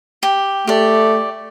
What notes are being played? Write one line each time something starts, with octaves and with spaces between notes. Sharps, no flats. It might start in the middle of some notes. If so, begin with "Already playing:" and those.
G4
A3 G4 D5